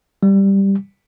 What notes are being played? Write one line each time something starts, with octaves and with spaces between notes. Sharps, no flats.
G3